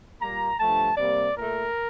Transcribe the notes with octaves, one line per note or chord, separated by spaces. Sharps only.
A#2 G3 A#3 A#5
G2 F3 A3 A5
C3 G3 A#3 D5
A#2 A3 A#4